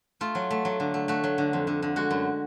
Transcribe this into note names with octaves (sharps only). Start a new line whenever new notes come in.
A3 F4
F#3
A3
F#3
D3
A3
A3 F#4
F#3
D3
F2
D3
D3
G#3 F#4
F#2